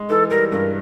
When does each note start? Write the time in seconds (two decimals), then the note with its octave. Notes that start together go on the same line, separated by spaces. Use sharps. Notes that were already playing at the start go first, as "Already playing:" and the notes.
Already playing: G#3
0.09 E3 A4
0.30 G3 A#4
0.52 G2 A#4